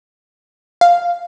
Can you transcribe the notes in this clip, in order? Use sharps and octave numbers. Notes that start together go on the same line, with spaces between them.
F5